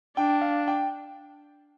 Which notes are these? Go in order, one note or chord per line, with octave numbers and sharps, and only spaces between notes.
D4 G5
F5
G5